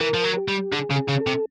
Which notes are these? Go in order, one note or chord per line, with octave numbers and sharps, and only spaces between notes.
E3 A#4
F3
F#3
G4
G3
D3 G#4
C#3
G#4
C#3
A4
C3